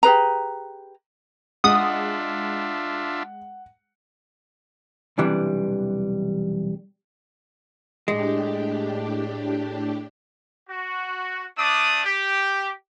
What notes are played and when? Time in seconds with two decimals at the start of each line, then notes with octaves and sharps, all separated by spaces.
0.03 G4 G#4 B4 A#5
1.64 G#3 D4 F4 E5 F#5 D#6
5.18 B1 E2 C3 E3 G3 D4
8.08 A2 G#3 D4 G4
10.69 F#4
11.58 A3 D4 D5 D#6
12.05 G4